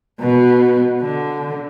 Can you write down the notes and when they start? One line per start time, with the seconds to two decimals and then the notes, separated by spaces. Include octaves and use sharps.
0.20 B2 B3
1.01 D3